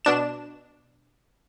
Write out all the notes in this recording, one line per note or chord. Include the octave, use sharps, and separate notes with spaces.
B2 D4 E7